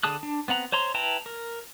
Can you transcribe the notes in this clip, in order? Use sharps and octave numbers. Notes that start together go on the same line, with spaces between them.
D3 G#4 A5 D#6 F#6
D4
B3 C4 F#5 A#5
C5 C#5 A#5 C6
E4 B4 G5 A5 A#5
A#4